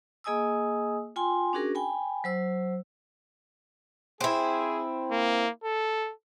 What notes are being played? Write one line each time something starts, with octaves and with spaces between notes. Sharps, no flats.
A#3 G#4 D#5 G#5 D#6 E6
F4 G5 G#5 C6
C#4 D4 F#4 G#4 A#4
G5 G#5 B5
F#3 C5 E6
C4 E4 G#4
A#3
A4